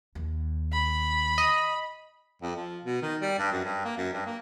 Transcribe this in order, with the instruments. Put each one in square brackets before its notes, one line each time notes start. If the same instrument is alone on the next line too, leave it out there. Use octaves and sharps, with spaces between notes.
[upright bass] D#2
[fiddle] B5
[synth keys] D#5
[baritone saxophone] F2
F3
B2
D#3
G3
G2
F#2
G2
A#3
F#2
G2
A#3